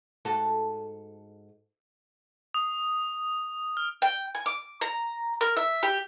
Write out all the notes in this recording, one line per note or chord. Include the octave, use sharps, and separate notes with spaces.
G#2 F#4 A4
D#6
F6
G5
G#5
D6
A#5
A#4
E5
G4